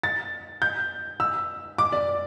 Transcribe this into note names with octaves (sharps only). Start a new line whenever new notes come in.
A6
G6
E6
D6
D5